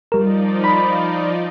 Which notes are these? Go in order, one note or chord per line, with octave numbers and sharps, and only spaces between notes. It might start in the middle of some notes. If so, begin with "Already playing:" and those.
F3 G3 D#4 A#4 D5
B5